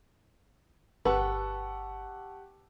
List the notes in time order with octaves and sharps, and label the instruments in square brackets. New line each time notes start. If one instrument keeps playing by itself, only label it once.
[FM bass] G1 [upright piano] G4 F#5 E6 [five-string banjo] B4 [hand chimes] A5 C#6